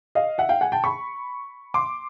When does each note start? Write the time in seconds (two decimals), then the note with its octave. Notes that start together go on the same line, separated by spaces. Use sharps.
0.15 D#5 F5
0.38 E5 F#5
0.49 F5 G5
0.61 F#5 G#5
0.72 G5 A5
0.84 B5 C#6
1.74 C6 D6